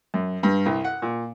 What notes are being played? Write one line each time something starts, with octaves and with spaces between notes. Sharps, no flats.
F#2
G2
C2
F#5
A#2